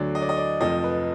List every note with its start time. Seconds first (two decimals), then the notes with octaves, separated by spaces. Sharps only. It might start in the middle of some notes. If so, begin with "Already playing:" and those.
Already playing: D2 D3 F#3 D5
0.15 D#5
0.22 D5
0.29 D#5
0.37 D5
0.60 F1 F2 F3 D#5
0.84 B4